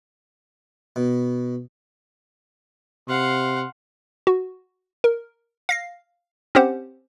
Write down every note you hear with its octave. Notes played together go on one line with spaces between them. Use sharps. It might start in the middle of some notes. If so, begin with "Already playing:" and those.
B2
C3 F5 F#5 C6
F#4
A#4
F5 A#6 C7
C4 C#4 G4 C5 F#5